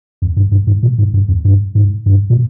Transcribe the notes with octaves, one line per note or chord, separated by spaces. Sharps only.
F2
G2
G2
G#2
A#2
G#2
G2
F2
G2
G#2
G2
A#2